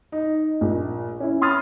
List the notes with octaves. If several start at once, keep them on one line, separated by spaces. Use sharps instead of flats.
D#4
A#1
C#4 E4
B5 C6 D#6 F6 A6